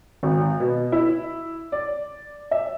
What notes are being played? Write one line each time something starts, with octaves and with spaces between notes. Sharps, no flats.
G#1
B2
E4
D5
E5